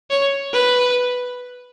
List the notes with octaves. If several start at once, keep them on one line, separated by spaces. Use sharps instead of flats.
C#5
B4